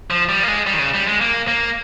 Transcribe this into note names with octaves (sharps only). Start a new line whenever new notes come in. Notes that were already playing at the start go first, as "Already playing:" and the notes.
F3
G3
A#3
G#3
G3
D#3
C#3
G3
G#3
A#3
A#3